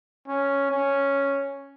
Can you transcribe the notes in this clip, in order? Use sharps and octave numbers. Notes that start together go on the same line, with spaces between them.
C#4
C#4